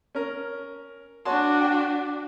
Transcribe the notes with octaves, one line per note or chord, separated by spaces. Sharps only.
C#4 A#4
D4 F#4 C#5 A5 C6
G5